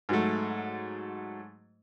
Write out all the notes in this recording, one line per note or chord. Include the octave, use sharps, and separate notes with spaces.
G#2 F#3 A3